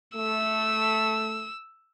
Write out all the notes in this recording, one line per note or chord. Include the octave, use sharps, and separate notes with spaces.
A3 E6